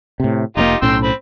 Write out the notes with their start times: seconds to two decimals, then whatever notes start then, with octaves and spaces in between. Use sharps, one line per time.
0.20 A2 C3
0.57 F1 C3 A#3 D#4 F4 G4
0.82 B1 A2 C#4 G5 C6 E6
1.03 C4 B5